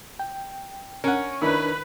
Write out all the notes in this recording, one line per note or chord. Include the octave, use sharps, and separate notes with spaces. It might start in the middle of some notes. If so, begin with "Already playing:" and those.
G5
C#4 A#4 F#5
D#3 D4 E4 A#4 B4